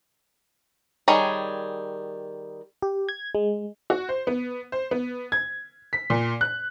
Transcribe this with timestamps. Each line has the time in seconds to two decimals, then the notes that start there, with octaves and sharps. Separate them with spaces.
1.08 D#3 G3 G#4 C#5
2.82 G4
3.09 G#6
3.35 G#3
3.90 F#4
4.09 C5
4.27 B3
4.72 C5
4.91 B3
5.32 G#6
5.93 B6
6.10 A#2
6.41 F#6